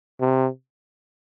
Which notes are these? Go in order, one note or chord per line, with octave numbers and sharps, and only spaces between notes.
C3